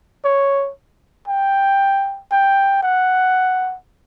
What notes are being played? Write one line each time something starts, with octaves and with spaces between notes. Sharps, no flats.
C#5
G5
G5
F#5